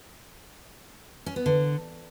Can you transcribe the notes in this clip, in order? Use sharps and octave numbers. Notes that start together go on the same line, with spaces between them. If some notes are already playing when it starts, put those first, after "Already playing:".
C#4
B3
D3